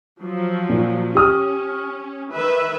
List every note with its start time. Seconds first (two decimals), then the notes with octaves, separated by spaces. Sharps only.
0.19 F3 F#3
0.69 A#2
1.15 C#4 G4 D#6 F6
2.33 D#3 B4 E5